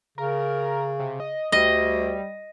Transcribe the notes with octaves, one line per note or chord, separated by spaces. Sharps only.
C#3 A#4
C3
D#5
D2 G3 D#5